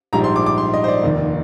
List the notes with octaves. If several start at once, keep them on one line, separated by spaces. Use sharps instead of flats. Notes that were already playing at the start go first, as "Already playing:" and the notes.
A#1 G#2 G3 A#5
C6
D6
D6
C6
D#5
C5
D5
F1 D#2 D#3 A#3